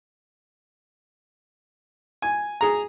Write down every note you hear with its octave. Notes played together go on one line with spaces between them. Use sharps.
G#5
G#4 A#5